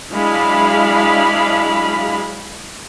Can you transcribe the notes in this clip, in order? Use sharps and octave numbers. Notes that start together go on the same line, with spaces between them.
F#3 G#3 D4 E4 F5 B5